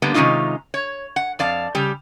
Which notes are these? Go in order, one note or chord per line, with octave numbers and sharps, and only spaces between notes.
D3 G3 A#3 B3
C3 D#3 G#3 C#4 D#4 F4
C#5
F#5
F2 D5 F5 A5
C#3 G3 G4